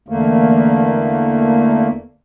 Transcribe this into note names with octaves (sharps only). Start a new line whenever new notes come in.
E2 D3 A3 A#3